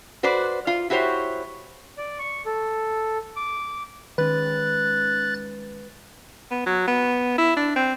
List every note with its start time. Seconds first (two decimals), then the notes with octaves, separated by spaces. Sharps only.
0.23 F#4 B4 C5 D5
0.67 F4
0.90 E4 F#4 G4 C5 C#5
1.98 D5
2.19 C#6
2.46 A4
3.36 D6
4.18 D#3 G#3 C#4 B4 F#6 A6
6.51 B3
6.66 F#3
6.88 B3
7.38 E4
7.57 D4
7.76 C4